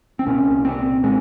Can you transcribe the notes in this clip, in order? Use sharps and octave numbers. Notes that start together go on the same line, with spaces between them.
C4
C2 A#2 C#4
C4
A#2 G#3